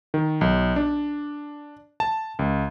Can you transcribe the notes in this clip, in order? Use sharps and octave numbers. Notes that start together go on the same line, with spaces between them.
D#3
B1
D4
A5
C#2